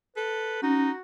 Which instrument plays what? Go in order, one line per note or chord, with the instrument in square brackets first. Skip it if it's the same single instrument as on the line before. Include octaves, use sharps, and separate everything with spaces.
[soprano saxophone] A4 [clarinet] B4
[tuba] C#4 [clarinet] D#4 [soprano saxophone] F#4